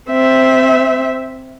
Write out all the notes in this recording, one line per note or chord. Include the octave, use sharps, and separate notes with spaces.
C4 E5